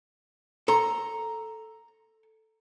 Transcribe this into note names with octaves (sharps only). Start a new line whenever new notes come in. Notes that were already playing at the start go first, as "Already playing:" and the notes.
A4 A#5 C6